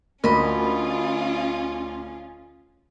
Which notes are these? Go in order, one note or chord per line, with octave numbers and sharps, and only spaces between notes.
D2 C#4 F4 A#4 D#5 B5